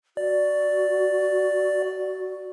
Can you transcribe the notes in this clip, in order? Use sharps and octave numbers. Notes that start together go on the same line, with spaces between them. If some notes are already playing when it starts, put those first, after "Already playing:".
F#4 D5